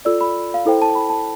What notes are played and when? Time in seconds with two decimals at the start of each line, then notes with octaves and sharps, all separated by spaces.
0.05 F4 A4 D5 E6
0.21 B5
0.54 F5
0.66 E4 A4 C5 G5
0.82 A5
0.95 B5
1.10 A5